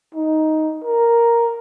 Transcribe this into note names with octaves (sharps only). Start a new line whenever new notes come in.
D#4
A#4